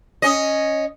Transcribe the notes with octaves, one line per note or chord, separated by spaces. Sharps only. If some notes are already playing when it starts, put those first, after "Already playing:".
C#4 D#5